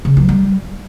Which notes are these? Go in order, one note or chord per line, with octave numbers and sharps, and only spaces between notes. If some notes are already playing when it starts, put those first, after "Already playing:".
C#3
F#3
G3